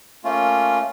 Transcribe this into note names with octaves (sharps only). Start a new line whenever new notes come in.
A3 A#3 C#4 F4